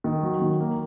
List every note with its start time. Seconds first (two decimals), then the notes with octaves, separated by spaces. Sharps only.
0.04 D#3
0.23 F#3
0.41 D#3
0.60 A#3